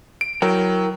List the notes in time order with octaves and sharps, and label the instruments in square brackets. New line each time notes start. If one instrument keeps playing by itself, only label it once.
[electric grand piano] D7
[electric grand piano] F#3 [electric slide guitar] E4 A#4 G5